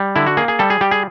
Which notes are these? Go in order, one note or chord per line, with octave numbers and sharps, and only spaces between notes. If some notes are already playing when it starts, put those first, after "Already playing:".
Already playing: G3
D3 E4
F#4
A#3 G#4
G#4
G3 A4
G#4
G3 G4
G#4